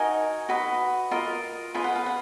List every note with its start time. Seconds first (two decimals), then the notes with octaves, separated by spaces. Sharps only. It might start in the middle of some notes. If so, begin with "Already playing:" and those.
Already playing: D#4 F#4 A#4 D#5 G#5
0.49 F#4 B4 D#5
1.11 F4 A#4 D#5
1.74 F4 B4 D#5 G#5
1.84 F#5
1.96 F5
2.06 F#5